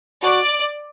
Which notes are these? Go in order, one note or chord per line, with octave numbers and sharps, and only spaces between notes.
F#4 D5